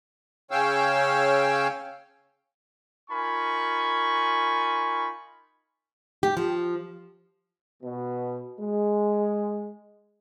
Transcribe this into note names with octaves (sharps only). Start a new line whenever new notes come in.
C#3 C#4 C#5 F5 G5 E6
D#4 F4 A#4 G#5 B5 C#6
G4
F3
B2
G#3